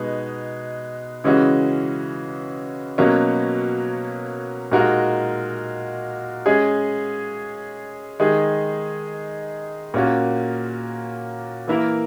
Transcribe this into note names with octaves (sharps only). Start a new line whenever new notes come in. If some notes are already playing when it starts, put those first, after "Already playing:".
Already playing: B2 G#3 B3 D#4
C#3 E3 G#3 C#4 F#4
B2 F#3 A#3 C#4
A#2 G#3 D#4 F#4 A#4
G#3 C#4 G#4
D#3 G#3 D#4 G#4
A#2 A#3 C#4 F#4
E3 A#3 E4 A#4